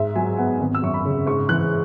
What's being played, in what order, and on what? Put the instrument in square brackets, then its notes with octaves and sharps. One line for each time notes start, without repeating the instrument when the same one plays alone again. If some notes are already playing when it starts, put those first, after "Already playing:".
Already playing: [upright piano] G#2 E5
F#3 G#5
B3 F#5
G#1
E6
F#2 C#6
B5
C#3
G#2 C#6
E3 F#6